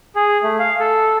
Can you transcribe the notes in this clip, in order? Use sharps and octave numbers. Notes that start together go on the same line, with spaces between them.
G#4
A3
F5
A4